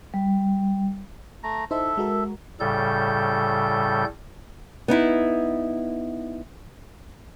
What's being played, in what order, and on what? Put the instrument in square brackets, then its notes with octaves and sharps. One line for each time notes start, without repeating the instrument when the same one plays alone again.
[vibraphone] G3
[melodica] A3 A#5
[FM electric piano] D#4 E4 C5 [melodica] A4 E5
[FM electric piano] G#3 F#4 A#4
[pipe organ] A2 C#3 G3 A4 G6
[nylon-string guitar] B3 D#4 E4